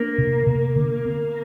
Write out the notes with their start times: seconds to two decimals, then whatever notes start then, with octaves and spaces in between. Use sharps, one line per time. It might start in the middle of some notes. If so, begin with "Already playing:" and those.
Already playing: A#3 D4
0.18 C3
0.47 C3
0.76 D3
1.05 C4